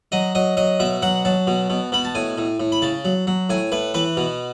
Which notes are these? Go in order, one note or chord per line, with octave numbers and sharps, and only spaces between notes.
F#3 D#5
F#3 D#5
F#3 D#5
B2 E5
F#3 F#5
F#3 A5
B2
B2
B2 B5
A5
A2 G#5
A2
A2
B5
C#3 A5
F#3
F#3
A2 G#5
A2 B4
E3 B4
B2